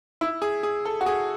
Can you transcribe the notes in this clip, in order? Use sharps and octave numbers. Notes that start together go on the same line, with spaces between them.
E4
G#4
G#4
A4
F#4
G#4